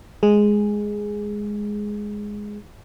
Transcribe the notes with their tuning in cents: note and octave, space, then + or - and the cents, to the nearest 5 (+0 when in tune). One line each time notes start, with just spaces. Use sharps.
G#3 +0 G#4 +0